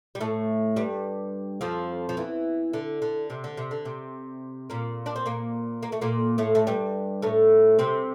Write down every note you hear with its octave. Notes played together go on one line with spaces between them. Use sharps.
G3
A2 A3
G2 G3
F2 F3
F3
E2 E3
D3
D3
C3
D3
C3
D3
C3
A#2 A#3
D4
C4
A#2 A#3
A#3
A3
A#2 A#3
A2 A3
A3
G2 G3
A2 A3
C3 C4